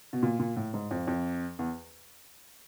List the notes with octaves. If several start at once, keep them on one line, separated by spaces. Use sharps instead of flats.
B2
A#2
A#2
A2
G#2
F2
F2
E2